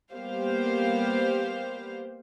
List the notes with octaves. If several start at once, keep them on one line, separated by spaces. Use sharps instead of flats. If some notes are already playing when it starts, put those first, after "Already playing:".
G3 A#3 B3 G4 C5 F5